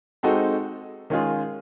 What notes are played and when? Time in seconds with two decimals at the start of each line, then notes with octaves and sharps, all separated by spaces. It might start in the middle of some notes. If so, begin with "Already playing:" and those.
0.23 G#3 C4 D#4 F#4 A4
1.10 D#3 G#3 C#4 F4 G#4